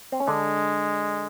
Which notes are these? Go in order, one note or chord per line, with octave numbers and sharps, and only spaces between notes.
C4
C#4
D3 G#3 D4